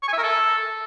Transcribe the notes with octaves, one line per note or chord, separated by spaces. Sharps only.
C#6
G#5
E5
A#4
A4